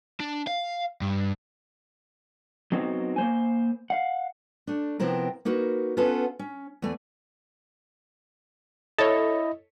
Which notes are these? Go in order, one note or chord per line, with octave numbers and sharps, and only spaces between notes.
D4
F5
G2
F#3 B3 C4 D#4 F#4
A#3 C5 G#5
F5 F#5
A3 D4
C3 F3 B3 C4 E4 A#4
A#3 D#4 F#4 A#4 B4
B3 C#4 F4 A4 B4 F#5
C#4
E2 A3 G#5
E4 A4 C#5 D#5